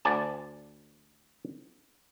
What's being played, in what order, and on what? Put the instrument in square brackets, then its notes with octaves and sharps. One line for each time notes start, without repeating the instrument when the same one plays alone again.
[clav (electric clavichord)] D2 D5 G#5 A5